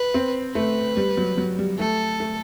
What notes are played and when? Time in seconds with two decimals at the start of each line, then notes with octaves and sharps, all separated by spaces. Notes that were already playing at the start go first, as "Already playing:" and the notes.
Already playing: B4
0.14 C4
0.55 A3 B4
0.97 G3
1.17 F#3
1.38 F#3
1.59 G3
1.79 A3 A4
2.20 A3